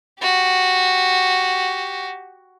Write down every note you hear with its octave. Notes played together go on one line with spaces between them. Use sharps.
F#4 G4